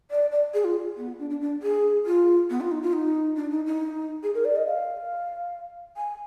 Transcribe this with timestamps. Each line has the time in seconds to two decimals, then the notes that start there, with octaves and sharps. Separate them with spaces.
0.11 D5
0.32 D5
0.54 G#4
0.64 F4
0.97 B3
1.19 D4
1.30 D4
1.41 D4
1.63 G#4
2.06 F4
2.50 B3
2.61 F4
2.71 D#4
2.82 F4
2.93 D#4
3.36 D4
3.51 D#4
3.66 D#4
4.23 G#4
4.35 A#4
4.45 D5
4.56 D#5
4.67 F5
5.97 G#5